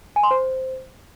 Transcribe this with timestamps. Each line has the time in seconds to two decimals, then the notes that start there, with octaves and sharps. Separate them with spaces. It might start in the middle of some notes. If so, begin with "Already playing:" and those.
0.16 G#5
0.23 C6
0.31 C5